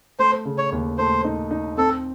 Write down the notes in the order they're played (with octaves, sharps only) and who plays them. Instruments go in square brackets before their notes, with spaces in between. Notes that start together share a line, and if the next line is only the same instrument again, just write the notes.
[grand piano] A3 [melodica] C5
[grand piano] C#3
[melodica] C#5
[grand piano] D#2
[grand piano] A3 [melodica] C5
[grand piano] D#4
D#4
[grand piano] C4 [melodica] A4